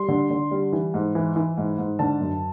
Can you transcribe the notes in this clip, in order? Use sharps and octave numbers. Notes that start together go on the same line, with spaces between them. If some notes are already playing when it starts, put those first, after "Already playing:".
Already playing: G3 C6
D3
D3
G3
E3
G#2
E3
E3
G#2
G#2
D3 A5
F#2